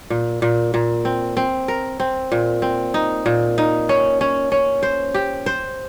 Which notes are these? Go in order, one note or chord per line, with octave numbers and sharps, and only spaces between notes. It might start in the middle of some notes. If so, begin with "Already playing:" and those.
A#2
A#2
A#2
C4
C4
A#4
C4
A#2
C4
D#4
A#2
D#4
C#4
C#4
C#4
C5
G4
C5